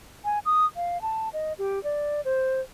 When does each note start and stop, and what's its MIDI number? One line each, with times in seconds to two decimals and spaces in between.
0.25 0.39 80
0.46 0.66 87
0.76 1.00 77
1.02 1.29 81
1.33 1.53 75
1.59 1.82 67
1.84 2.21 74
2.25 2.61 72